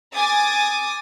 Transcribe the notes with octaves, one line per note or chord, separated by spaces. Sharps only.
G#5 D6 D#6 A6